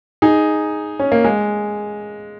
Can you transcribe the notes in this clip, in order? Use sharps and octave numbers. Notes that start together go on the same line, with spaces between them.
D#4 G#4
C#4
A#3
G#3